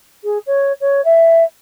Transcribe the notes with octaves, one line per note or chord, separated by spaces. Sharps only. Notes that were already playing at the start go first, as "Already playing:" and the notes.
G#4
C#5
C#5
E5